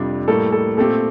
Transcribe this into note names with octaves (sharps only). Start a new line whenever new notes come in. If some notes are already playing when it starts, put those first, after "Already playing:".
Already playing: F2 C3 G3 D4
A2 G3 A#3 A4
A4
A#2 A3 C4 G4 A4